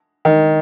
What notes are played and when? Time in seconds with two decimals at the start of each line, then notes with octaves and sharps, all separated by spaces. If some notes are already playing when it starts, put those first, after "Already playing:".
0.25 D#3